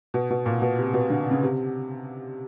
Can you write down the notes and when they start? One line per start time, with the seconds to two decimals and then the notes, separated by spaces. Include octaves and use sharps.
0.14 B2
0.30 B2
0.46 A#2
0.62 B2
0.79 C3
0.94 B2
1.10 D3
1.31 C#3
1.43 C3